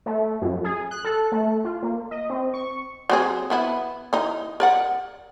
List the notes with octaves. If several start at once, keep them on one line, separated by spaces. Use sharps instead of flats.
A3
F#2
G#4
F#6
A4
A3
F4
A#3
D#5
C4
C#6
F#3 C4 G#4
E3 B3 E4
E3 D#4
A#4 D5 F#5